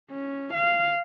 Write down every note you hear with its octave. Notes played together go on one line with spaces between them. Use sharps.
C#4
F5